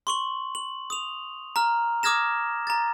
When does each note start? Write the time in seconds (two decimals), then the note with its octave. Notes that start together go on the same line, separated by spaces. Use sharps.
0.07 C6 C#6 F#7
0.55 F#7
0.90 D#6 F7
1.56 A#5 F6
2.03 D6 D#6 F6 G#6 A#6 E7
2.67 A#5 A6